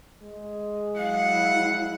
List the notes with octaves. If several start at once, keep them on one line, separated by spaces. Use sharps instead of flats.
G#3
F#3 E4 F5 F#5